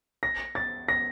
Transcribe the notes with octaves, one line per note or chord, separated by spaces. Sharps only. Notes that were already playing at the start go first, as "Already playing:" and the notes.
A#6
A6
A#6